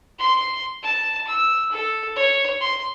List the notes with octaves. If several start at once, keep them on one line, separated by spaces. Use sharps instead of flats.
C6
A5
E6
A4
C#5
C6